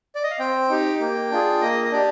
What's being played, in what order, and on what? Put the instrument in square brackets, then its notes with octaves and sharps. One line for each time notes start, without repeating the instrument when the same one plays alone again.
[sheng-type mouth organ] D5
D#5
F5
C4 G5
D#4 G4
A#3
D4 F4 G#4
A#3 D#5
D#5
D4 G4 D5